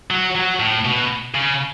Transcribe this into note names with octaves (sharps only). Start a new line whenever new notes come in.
F#3
F#3
A2
B2
C#3